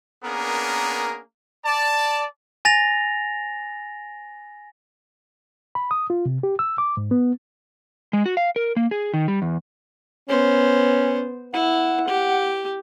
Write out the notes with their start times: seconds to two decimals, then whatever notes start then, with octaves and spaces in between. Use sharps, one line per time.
0.24 A#3 B3 C#4 D4 G#4 A#4
1.65 D5 A5
2.65 G#5 A6 A#6 F7
5.75 B5
5.91 D#6
6.10 F4
6.26 C3
6.43 G4
6.59 E6
6.78 D6
6.97 G#2
7.11 B3
8.13 G#3
8.26 F#4
8.37 F5
8.56 A#4
8.76 A#3
8.91 G#4
9.14 D#3
9.28 G3
9.42 E2
10.29 B3 C#4 C5
11.54 E4 F#5
12.08 G4